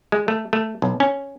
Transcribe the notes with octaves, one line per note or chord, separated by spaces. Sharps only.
G#3
A3
A3
B1
C#4